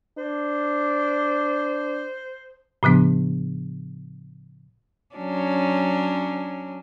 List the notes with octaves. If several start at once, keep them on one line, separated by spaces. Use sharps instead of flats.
D4 C5
A2 C#3 F3 B3 D4
F#3 C#4 D4